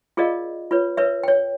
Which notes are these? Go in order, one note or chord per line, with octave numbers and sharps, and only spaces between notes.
F4 G#4 A#4 D5 D#5 F5
F4 B4 C#5
A#4 B4 C#5 E5
C#5 G5